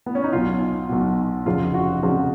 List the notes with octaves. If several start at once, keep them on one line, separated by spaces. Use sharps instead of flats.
B3
C#4
D#4
B1 B2 F4
B1 B2
F1 F2 C#3 F3 F4
F#4
F1 F2 C#3 F3 F#4